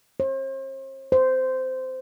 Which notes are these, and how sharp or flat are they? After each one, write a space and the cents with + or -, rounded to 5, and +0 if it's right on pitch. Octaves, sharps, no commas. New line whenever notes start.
C5 +45
C5 -15